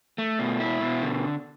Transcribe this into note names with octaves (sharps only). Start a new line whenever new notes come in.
A3
B2
E4
B2
D3